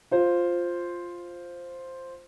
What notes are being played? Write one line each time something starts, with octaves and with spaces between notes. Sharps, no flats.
F4 C5